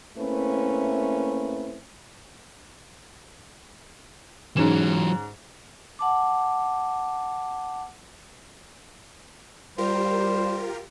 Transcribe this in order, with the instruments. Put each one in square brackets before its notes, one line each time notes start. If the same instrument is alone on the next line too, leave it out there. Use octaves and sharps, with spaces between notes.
[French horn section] A3 A#3 C4 C#4 E4 B4
[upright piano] G#2 C#4 E7 [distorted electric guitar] E3 F#3
[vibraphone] F#5 A5 D6
[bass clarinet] G3 [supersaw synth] F4 G4 A#4 [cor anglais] C5